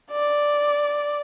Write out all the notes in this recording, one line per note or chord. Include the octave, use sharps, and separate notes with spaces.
D5